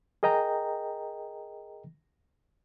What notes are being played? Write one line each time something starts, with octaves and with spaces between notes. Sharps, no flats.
G#4 A#4 D#5 G5 A#5